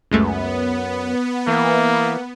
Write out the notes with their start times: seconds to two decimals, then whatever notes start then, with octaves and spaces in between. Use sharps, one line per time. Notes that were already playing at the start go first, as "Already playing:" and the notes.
0.11 C#2 F#2 G#3 A3 B3
1.47 E3 A#3